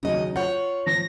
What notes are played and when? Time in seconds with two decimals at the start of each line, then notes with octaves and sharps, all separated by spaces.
0.03 D#2 C#3 F#3 D#4 D#5
0.36 F4 C#5 F#5 G6
0.87 F3 A#6